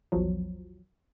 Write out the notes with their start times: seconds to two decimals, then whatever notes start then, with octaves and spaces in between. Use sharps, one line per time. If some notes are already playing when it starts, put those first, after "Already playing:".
0.12 A#1 E2 F3 F#3